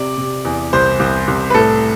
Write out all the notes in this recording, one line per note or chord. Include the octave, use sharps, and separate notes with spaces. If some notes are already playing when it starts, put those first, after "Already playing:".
Already playing: C3 D5
C3
E2
C2 C5
C2
C2
B4
A2 A4